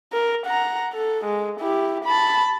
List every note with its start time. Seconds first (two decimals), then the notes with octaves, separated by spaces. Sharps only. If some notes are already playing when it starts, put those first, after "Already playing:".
0.13 A#4
0.46 F#5 A#5
0.94 A4
1.25 G#3
1.61 E4 G4
2.05 A5 B5